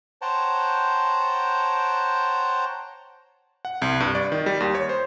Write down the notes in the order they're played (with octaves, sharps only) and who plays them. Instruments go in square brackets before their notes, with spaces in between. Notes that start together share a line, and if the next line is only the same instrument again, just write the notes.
[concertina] C5 C#5 F#5 G5 A5 A#5
[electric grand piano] F#5
C2
G2
D5
D#3
G3
D#2
C#5
C5